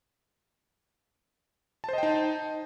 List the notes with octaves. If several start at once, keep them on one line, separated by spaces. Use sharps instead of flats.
D#4 C5 D#5 G5 A5